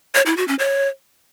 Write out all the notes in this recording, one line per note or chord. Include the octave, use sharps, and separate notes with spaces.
C#5
E4
F#4
C#4
C#5